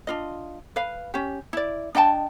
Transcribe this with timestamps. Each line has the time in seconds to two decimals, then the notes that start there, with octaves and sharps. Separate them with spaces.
0.07 D4 F4 D#5
0.76 B4 F5
1.14 C#4 G4
1.53 E4 D5
1.95 D4 D#5 G5 A5